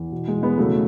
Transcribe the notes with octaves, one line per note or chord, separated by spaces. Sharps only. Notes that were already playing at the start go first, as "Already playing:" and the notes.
Already playing: E2
B2
G#3
E2
G#3 B3
C#3 F#3 A3